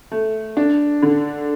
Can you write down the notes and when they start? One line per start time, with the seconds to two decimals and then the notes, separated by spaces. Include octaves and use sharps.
0.12 A3
0.57 D4
1.03 D3